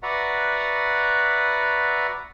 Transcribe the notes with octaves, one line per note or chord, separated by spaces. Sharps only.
F#4 B4 D5 E5 F#5 A#5